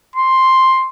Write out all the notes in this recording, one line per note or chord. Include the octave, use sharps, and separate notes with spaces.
C6